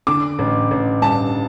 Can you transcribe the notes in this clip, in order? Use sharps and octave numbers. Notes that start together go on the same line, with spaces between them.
D3 D6
A1
A1
G2 A5